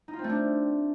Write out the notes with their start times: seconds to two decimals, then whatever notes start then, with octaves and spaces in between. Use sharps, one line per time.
0.08 D#4
0.13 F4
0.19 C4
0.24 A3
0.30 D4